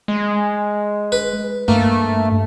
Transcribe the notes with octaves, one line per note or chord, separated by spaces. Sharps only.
G#3
B4
G2 A3 A#3